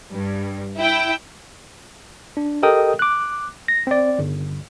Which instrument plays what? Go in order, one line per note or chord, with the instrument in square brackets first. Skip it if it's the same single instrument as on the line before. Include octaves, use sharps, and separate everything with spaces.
[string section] G2
E4 G5
[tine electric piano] D4
G4 A4 A#4 D#5 G5 D#6
D6 F#6
A#6
C4 D5
G1